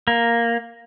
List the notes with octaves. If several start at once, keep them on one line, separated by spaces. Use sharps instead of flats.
A#3